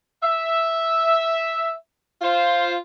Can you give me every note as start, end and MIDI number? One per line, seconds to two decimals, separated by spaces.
0.23 1.73 76
2.21 2.75 65
2.21 2.75 72